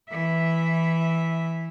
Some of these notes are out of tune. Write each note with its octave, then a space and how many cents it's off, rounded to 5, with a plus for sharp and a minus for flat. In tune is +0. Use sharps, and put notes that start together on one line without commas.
E3 +0 E5 -5